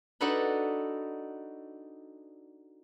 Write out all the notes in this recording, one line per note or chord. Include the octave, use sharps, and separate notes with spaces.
D4 D#4 F#4 A4 B4 B5